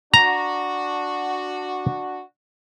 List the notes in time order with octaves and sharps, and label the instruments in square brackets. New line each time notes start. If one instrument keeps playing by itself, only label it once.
[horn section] D4 F#4 [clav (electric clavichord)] A#5